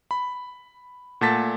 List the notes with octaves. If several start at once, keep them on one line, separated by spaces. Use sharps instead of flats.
B5
A#2 A3 F#5 A5 A6 B6